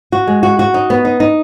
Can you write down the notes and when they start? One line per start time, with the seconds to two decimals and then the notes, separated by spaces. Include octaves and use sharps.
0.12 F#4
0.27 G#3
0.43 F#4
0.59 F#4
0.74 D#4
0.90 B3
1.05 D#4
1.20 D#4